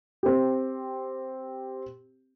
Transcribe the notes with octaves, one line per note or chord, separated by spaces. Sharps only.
C4 G4